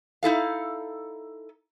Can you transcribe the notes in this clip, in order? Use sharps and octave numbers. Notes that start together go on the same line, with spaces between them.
D#4 E4 A4 F5